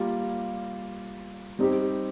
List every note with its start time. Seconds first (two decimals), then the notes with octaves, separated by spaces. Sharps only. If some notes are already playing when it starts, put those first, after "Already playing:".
Already playing: G3 A#3 F4
1.59 G3 C4 D#4 G4